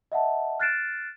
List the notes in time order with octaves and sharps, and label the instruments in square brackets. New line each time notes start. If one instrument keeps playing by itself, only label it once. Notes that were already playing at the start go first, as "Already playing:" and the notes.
[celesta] D#5 E5 F#5 A5
F6 F#6 A6 C7 D7 E7